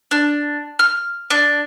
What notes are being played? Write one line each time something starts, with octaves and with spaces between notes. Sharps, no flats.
D4
F6
D4